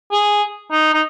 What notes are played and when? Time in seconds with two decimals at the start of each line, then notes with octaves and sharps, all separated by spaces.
0.12 G#4
0.72 D#4
0.94 D#4